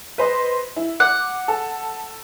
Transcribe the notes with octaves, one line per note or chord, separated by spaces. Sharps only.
B4 C5 D#5
E4
F#5 D6
A4